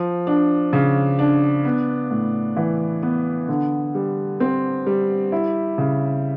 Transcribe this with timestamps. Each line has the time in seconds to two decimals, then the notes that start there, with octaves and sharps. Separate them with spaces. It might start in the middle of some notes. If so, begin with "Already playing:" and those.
Already playing: F3
0.27 D4
0.73 C#3
1.19 D4
1.65 B3
2.11 A2
2.56 E3
3.02 B3
3.48 D3
3.95 G3
4.40 C4
4.87 G3
5.32 E4
5.78 C#3